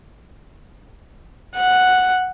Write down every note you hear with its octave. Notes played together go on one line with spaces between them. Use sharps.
F#5